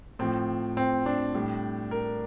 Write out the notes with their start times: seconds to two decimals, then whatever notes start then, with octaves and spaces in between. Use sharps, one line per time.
0.19 A2 F3 C4
0.77 C4
1.06 D4
1.34 A2 G3
1.91 A#4